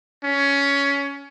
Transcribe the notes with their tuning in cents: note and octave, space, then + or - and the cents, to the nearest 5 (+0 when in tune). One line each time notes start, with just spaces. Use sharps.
C#4 +15